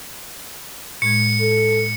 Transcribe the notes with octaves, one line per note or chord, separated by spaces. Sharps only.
A2 G#3 G#6 C#7
A4